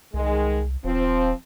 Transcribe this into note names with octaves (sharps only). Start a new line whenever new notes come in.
C2 D#3 G#3
D#1 F3 C4